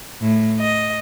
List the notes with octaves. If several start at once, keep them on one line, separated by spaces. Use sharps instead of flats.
A2
D#5